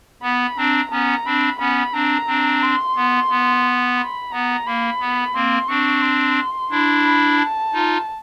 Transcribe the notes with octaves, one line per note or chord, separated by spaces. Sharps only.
B3 B5
C4 D4 A#5
B3 C#4 A#5
C4 D4 B5
B3 C#4 B5
C4 D4 A#5
C4 D4
C6
B3
B3
B5
B3 A#5
A#3 B5
B3
A#3 C4 C6
C4 D4 C#6
C6
D4 E4
B5
A5
D#4 F4